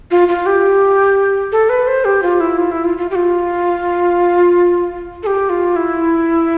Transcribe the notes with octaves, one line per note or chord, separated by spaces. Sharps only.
F4
F4
G4
A4
B4
C5
G4
F4
E4
F4
E4
F4
F4
G4
F4
A4
G4
F4
E4